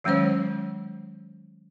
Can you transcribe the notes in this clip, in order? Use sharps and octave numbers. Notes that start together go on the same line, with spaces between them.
D#3 F#3 G#3 C#4 C5 C#5